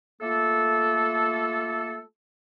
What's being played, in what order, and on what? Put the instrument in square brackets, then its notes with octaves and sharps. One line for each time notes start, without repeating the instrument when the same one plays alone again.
[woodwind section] A3 A#3 F4 A4